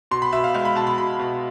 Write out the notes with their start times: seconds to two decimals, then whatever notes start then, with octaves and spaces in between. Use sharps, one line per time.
0.11 B2 C6
0.22 B5
0.33 B2 E5
0.44 F5
0.54 G#3 F5
0.65 B5
0.75 B2 A5
0.87 B5
0.98 B2 B5
1.19 B2